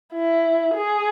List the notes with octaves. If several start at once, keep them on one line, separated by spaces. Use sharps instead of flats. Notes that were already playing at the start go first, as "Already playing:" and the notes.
E4
G#4